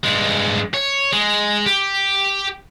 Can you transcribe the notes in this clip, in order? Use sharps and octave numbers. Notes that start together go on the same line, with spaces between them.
G2 G#3
C#5
G#3
G4